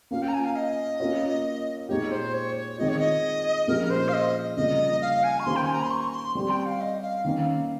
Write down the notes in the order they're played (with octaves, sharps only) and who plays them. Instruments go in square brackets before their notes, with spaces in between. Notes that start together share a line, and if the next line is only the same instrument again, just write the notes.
[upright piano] A#3 C#4 F4 [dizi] F5
[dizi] G5
A#5
G#5
F5
D#5
[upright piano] A#3 C#4 F4 A#4 C#5
[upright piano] A#2 G#3 D#4 G4 [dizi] C#5
[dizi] C5
C#5
C#5
[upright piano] D#3 G#3 C4 F4 [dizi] D#5
[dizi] C#5
D#5
[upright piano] A#2 F3 G#3 C#4 G4 [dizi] A#4
[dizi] C5
F5
D#5
[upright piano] C#3 G3 A#3 F4 [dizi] D#5
[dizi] F5
G#5
C#6
[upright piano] D#3 A#3 C#4 G4 C5 [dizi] C6
[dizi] G5
G#5
A#5
C6
C#6
C6
[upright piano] G3 C4 G4 [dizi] C6
[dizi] G5
F5
D#5
F5
[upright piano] D#3 A#3 C#4 [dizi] F5